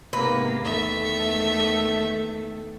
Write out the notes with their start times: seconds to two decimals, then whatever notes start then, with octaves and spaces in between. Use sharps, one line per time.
0.13 G#2 C3 A#3 B3 B4
0.64 E2 D#3 A3 A4 E5